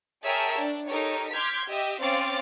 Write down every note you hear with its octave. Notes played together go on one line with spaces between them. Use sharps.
G#4 A#4 C#5 E5 G5 A5
D4
D#4 G4 A4 A#4 C#5
C6 D6 F6 G6 G#6 B6
G4 D#5 E5
C4 C#4 F5 D6 A6